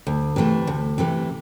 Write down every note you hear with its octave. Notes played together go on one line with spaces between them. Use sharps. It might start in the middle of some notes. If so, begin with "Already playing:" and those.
D2
C3 E3 A3
D2
C3 E3 A3